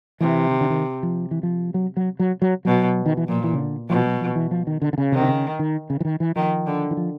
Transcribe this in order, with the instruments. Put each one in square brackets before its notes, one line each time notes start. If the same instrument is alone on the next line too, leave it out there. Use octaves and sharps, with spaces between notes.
[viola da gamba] C3 [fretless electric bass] E3
[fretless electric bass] D#3
D3
D#3
F3
E3
F3
F#3
F#3
F#3
F#3
[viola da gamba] B2 [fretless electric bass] F#3
[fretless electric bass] D#3
E3
[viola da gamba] A#2 [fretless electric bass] F3
[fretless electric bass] E3
C#3
D3
[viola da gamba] B2 [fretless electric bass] F3
[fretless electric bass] F#3
F3
E3
F3
D#3
D3
D3
C#3
[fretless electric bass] C3 [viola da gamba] D#3
[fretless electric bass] D3
C#3
D#3
C#3
E3
D#3
E3
[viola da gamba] D#3 [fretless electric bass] F3
[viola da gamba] D3
[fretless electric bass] E3
F3